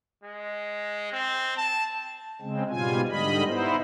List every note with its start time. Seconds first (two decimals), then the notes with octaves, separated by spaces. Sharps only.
0.24 G#3
1.12 C4
1.57 A5
2.41 C#3 G#3 C4
2.70 G#2 B2 G3 F4 G#5
3.10 G#2 D3 G3 D#5 B5
3.46 B3 D#4 E4 C5